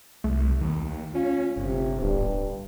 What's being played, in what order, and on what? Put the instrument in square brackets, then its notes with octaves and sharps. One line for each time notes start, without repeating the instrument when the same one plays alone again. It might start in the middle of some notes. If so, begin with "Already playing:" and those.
[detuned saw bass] C2 [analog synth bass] A3
[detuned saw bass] D#2
[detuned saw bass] C#4 [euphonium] F4
[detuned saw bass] G1 [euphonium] C3
[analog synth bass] D1 [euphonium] G2